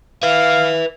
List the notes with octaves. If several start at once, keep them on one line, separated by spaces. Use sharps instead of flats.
B4 E5 F5